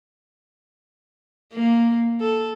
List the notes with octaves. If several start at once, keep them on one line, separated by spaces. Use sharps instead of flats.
A#3
A4